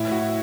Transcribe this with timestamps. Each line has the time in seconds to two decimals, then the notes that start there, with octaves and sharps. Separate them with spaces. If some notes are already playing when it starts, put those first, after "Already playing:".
Already playing: A2 E4 E5
0.12 F#4